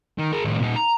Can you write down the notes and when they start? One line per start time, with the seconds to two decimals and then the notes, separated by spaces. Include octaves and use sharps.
0.18 D#3
0.33 G#4 A#4
0.45 A2 D#3
0.60 A#2 D#4
0.76 A#5